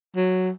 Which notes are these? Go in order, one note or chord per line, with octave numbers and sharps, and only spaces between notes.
F#3